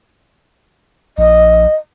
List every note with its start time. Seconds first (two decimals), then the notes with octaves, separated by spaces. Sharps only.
1.18 A#1 D#5